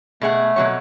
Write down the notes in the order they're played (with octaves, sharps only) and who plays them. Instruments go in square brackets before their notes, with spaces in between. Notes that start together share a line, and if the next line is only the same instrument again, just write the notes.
[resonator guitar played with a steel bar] B2 G#4 F#5 [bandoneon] A3
[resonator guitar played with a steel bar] B2 F#3 C#5